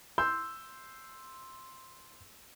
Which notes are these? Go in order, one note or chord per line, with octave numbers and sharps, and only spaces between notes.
C6 E6 G6